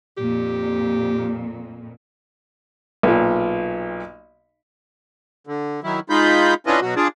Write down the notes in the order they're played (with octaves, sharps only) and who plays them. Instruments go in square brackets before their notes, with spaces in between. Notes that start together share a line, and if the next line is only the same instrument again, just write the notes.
[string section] F2 A#2 [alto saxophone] G4
[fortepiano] B1 A#2
[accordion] D3
D#3 F#3 E4
G#3 D#4 F4 B5 G6
C#4 D4 E4 F4 B4 D#5
B2 F#3 F#4
D4 F4 G#4 D5